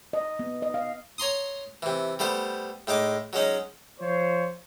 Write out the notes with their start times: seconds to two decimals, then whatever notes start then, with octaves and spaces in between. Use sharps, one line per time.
0.13 D#5
0.39 B3
0.62 D#5
0.74 F5
1.18 C#5 A#5 C6 D#6
1.82 C3 E3
2.19 G3 A3 B3 C5
2.87 A2 G#3 D#4 D6
3.33 F#3 G#3 C#4 D#4
4.00 F3 C5 C#5